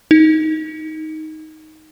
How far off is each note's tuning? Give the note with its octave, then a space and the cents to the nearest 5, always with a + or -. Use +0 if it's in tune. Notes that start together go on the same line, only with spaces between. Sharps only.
D#4 +10